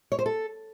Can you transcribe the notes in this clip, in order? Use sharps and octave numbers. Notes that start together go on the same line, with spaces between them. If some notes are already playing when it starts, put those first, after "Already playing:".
C#5
C5
A4